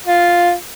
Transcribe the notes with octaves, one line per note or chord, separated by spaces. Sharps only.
F4